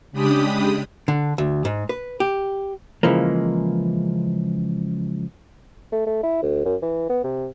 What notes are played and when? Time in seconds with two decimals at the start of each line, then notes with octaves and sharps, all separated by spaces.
0.12 C#3 G#3 D4 G4 B5 D#6
1.08 D3
1.38 D2
1.65 G#2
1.89 B4
2.20 G4
3.03 C#3 E3 F3 G#3 A#3
5.92 A3
6.06 A3
6.23 E4
6.42 D2
6.65 F#2
6.82 E3
7.10 B3
7.24 C3